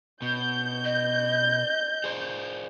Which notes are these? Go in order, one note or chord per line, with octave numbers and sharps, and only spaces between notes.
B2 G6
D#5
G#4 C5 D5